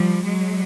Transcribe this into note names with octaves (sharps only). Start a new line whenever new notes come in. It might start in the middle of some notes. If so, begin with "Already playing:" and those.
Already playing: F3 G3
F#3 G#3